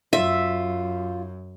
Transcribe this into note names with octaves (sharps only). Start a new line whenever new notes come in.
F#2 F4 E5